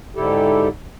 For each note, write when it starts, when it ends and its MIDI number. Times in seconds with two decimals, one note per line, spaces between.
0.16 0.68 44
0.16 0.68 50
0.16 0.68 64
0.16 0.68 67
0.16 0.68 69